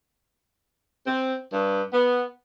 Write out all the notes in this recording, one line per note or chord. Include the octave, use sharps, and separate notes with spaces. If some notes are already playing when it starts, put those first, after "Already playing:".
C4
G2
B3